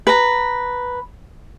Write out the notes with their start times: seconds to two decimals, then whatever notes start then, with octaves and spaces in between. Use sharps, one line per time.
0.07 B4 A#5